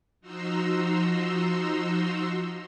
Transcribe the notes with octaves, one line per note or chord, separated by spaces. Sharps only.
F3 D#4 F#4 A#5 C6 E6